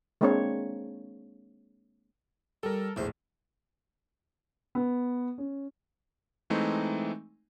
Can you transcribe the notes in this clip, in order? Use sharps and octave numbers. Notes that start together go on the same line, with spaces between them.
G#3 A#3 C4 D4 C5 C#5
G3 A4 A#4
A#1 E2 A2 C5
B3
C#4
E3 G#3 A3 C4 D#4